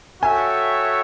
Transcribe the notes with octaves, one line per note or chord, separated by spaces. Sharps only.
F#4 A4 C#5 E5 G5 G#5